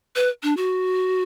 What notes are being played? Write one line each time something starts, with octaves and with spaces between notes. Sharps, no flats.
B4
D4
F#4